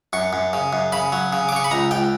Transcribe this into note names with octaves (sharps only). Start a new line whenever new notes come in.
F#2 C#6
F#2
C#3
F#2
C#3 B5
F#3
C#3
D6
C#3 C#6
B5
C#2 A#5
C#2 G5